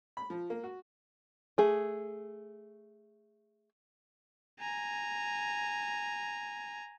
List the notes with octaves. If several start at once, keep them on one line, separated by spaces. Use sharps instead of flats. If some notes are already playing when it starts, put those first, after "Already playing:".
B5
F3
A#3
F#4
A3 G#4
G#5 A#5